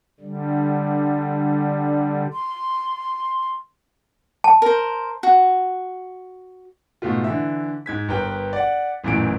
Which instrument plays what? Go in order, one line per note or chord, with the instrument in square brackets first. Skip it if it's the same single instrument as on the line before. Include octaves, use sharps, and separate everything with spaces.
[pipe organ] D3 G3
[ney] C6
[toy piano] A5
[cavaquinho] A#4 C5
F#4
[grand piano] G#2 B2 A3 F4
D3 E3 E5
G#2 G#6 B6
G1 G4 A#4 B4 G5
D5 F#5
A1 F#2 A#2 E3 A3 D7